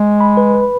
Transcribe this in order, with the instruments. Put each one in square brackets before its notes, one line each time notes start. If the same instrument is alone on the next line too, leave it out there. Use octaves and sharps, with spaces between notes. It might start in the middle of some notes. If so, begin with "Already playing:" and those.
Already playing: [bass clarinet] G#3
[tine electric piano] B5
B4
B4